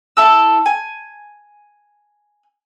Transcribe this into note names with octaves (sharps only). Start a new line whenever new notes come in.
E4 A4 E6
G#5